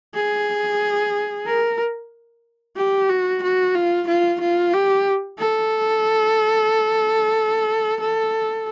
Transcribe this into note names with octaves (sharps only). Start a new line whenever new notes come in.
G#4
A#4
G4
F#4
F#4
F4
F4
F4
G4
A4
A4